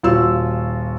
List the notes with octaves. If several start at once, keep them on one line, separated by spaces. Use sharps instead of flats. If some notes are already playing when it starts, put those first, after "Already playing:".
D#1 F4 F#4 E6